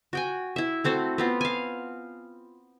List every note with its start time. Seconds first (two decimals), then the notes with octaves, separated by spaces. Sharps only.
0.13 F#4 G5 G#5
0.56 E4 E5
0.84 A3 C4 F#4 A4
1.18 B3 C4 F4
1.41 F5 G#5